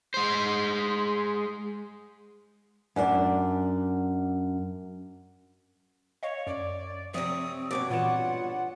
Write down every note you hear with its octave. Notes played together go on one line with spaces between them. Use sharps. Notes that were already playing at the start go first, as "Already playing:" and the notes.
G#3 C5
F#2 D4 F#4 D5
C#5 D#5 F5
F#2 D5
C3 F3 C4 C#5 D5 E5 D#6
G2 B2 C#5 D6 A6
A#2 E3 F4 F#5 E7